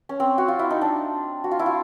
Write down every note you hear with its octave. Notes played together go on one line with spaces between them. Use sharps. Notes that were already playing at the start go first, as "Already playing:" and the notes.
C#4
C4
F#4
F4
E4
D#4
D4
F#4
F4
E4
F4